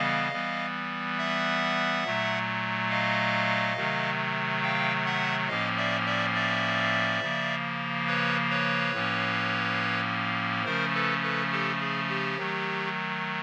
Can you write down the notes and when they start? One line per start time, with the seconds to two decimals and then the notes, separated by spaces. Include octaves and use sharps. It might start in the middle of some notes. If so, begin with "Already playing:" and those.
Already playing: C#3 E3 G3 B3 D#5 F5
0.32 E3 G3 B3
1.18 E5 F#5
2.04 A#2 F#3 A3
2.90 D#5 F5
3.76 C3 D#3 F#3 A3
4.62 F5 G5
5.05 E5 F#5
5.48 A2 F3 A#3 C#4 D#5 F5
5.77 D5 E5
6.06 D5 E5
6.34 D5 E5
7.21 C#3 F3 A#3
8.07 B4 C#5
8.50 B4 C#5
8.93 A2 F3 A#3 C#4
10.65 C#3 F3 A3 C#4 A#4 C5
10.94 A4 B4
11.22 A4 B4
11.51 G4 A4
11.80 G#4
12.09 G4
12.37 D#3 F#3 A3